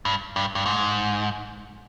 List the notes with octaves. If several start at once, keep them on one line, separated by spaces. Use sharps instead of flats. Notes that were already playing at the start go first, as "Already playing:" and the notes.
G2
G2
G2
G#2